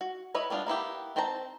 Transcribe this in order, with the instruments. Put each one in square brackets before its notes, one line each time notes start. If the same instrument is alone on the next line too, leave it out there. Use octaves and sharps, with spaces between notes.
[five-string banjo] F#4
E4 B4 C#5 D#5
G3 B3 D4 F4
A#3 B3 E4 G4
C4 C5 G5 A5 A#5